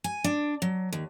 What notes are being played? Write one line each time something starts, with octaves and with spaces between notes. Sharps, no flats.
G#5
D4
F#3
D#2